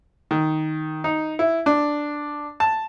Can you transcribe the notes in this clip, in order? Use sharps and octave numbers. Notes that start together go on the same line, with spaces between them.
D#3
D#4
E4
D4
A5